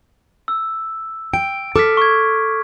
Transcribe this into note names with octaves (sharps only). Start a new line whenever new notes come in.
E6
G5 D7
A4 D6 F6 B6
C#6 G#6